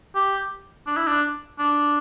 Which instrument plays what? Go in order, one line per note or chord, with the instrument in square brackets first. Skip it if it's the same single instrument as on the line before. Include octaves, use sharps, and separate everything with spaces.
[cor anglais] G4
D4
E4
D4
D4